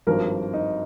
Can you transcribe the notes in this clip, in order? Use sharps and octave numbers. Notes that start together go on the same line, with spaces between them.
G#1 G2 F3 A#4
D#4